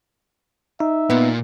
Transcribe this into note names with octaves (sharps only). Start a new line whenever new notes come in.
D#4 E5
A#2 B3